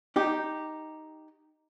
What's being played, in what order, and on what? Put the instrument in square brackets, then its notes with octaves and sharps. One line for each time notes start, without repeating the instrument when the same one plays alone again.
[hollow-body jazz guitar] D#4 G4